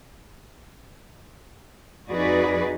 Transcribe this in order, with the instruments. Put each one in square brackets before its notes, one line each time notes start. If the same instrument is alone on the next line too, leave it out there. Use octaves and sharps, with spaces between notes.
[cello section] F2 D#4 F#4 G#4 B4 D5